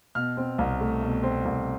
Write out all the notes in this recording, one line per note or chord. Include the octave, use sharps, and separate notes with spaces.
B2 F6
C4
C2
A3
B2
C4
C2